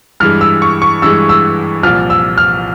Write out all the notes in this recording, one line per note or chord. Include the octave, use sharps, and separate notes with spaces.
G2 E3 G#3 F6
E6
C#6
C#6
G2 E3 G#3 E6
E6
C2 A#2 F3 F6
E6
F6